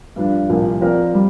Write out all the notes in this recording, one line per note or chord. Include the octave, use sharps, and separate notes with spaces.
G2 F3 D4
C2 A#2 F3 A#3
F3 C4 A#4 D5
G3